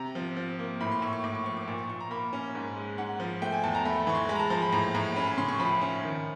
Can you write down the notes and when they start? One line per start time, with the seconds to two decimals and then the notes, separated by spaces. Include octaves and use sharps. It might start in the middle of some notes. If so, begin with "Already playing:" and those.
Already playing: C3 A#5
0.15 F3
0.37 F3
0.59 A#3
0.80 A2 B5
0.92 C6
1.02 A2 C#6
1.13 C#6
1.24 A2 D6
1.35 C#6
1.46 F3 C#6
1.57 D6
1.68 A#2 C#6
1.78 C#6
1.89 A#2 C#6
2.00 A#5
2.11 A#3 B5
2.33 C#4
2.55 G#2
2.77 G#3
2.98 G#2 F#5
3.20 F3
3.42 A3 G5
3.52 G#5
3.64 E2 A5
3.75 A#5
3.85 A3 B5
4.00 B5
4.07 E3 C#6
4.15 C6
4.29 G#3 B5
4.35 A#5
4.40 A5
4.50 F3 A#5
4.62 B5
4.72 A2 A#5
4.94 A2 A#5
5.16 C#4 B5
5.27 B5
5.38 C#3 C6
5.49 C#6
5.59 F3 B5
5.81 C#4
6.03 D#3